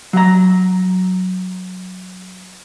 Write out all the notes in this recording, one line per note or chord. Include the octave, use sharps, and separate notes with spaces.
F#3 A#5